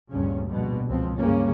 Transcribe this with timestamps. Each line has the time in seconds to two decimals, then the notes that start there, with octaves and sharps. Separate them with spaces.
0.10 G1 D2 G2 A#2 C#3 C#4
0.48 A#1 B2 G3
0.88 C#2 F3 G#3 C4
1.17 G2 C#3 G3 A#3 C#4